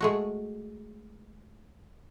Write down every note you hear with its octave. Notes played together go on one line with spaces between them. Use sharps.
G#3 A3 F#4